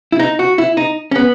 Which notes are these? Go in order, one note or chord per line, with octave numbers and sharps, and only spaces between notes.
E4
D#4
F#4
E4
D#4
C#4
B3